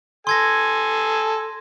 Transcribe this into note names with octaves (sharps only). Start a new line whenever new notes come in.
A4 G#5 C6 G#6 A#6